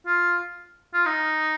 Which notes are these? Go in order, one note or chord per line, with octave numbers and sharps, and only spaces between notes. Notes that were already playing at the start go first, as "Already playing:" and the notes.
F4
F4
D#4